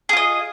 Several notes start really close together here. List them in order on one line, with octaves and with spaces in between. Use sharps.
G#4 F4 D#5